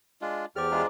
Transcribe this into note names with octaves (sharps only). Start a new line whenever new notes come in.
G#3 D4 F4
E2 G4 G#4 C5 D5 D6 F6
G#3 D4 F4 A#5